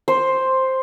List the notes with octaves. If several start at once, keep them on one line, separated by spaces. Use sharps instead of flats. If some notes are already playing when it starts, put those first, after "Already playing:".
C5